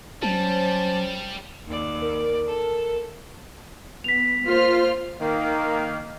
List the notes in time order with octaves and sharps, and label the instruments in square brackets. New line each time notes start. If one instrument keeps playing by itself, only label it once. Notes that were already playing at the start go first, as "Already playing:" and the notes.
[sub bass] F#3 [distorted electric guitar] G3 [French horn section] C#4 C5 [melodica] A5
[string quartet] D#2 D5
[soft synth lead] A#4
[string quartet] A4
[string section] B3 [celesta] B6 F7
[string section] A#3 C5 F6 [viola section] F4
[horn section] D#3 A#3